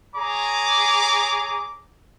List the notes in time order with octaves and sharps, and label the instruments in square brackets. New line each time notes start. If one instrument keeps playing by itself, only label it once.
[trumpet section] G#4 C#5 A#5 D6